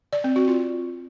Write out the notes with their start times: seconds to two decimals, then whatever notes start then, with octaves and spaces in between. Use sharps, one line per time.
0.13 D5
0.24 C4
0.36 F#4
0.47 F4